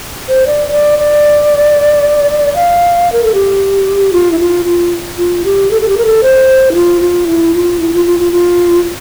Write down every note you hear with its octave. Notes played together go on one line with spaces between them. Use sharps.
C5
D5
D5
D5
F5
A#4
A4
G4
F4
E4
F4
F4
F4
G4
A4
A4
G4
A#4
A4
C5
E4
F4
F4
E4
F4
E4
F4
F4
F4
F4